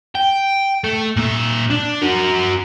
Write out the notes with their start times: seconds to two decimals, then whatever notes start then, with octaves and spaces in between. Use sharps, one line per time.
0.15 G5
0.84 A3
1.17 A#2 E5
1.70 D4
2.02 F#4 A#4